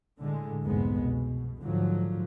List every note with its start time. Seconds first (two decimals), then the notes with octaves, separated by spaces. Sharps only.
0.19 A2 D3 G#3
0.63 F1 C2 G#2 G#3 B3
1.03 B2
1.63 G#2 D3 F3 F#3